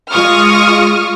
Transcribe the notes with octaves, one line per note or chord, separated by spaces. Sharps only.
G#3 F4 C#6 D#6 F6